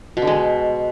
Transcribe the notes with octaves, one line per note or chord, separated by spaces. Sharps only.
B2
D3
G#3